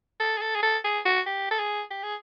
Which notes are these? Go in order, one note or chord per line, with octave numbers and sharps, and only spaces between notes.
A4
G#4
A4
G#4
A4
G#4
F#4
G4
A4
G#4
G4
G#4